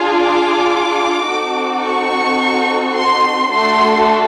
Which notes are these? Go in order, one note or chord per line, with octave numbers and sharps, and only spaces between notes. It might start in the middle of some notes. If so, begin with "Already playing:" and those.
Already playing: D4 F4 G#4
D6
C4 D#4 F#4 A4
C#6
C6
A3 D4 F#4 A4 C6